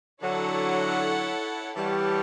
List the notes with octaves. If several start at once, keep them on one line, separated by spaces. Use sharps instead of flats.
D3 F#3 E4 A4 C#5 F#5
E3 G3 G4 C#5 F#5 A5